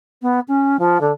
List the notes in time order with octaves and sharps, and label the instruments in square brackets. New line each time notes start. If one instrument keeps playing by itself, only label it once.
[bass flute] B3
C#4
F3
D3